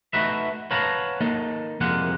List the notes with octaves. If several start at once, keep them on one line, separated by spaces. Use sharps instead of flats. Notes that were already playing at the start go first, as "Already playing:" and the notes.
A3 D#4 F#4 B4 E5
B4 C#5 F5 F#5 A5 A#5
A#3 D#4 A4
C2 F2 G#3 A#3 F#5